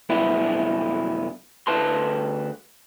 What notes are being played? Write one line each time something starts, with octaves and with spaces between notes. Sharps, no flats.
C2 F#2 B3 E4
D2 B4 A5 C6